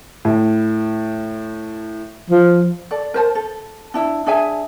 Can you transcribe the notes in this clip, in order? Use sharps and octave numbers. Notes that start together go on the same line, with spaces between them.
A2
F3
A4 D5
A#4 C5 A5
A4
D4 E4 E5
D4 G#4 E5 G#5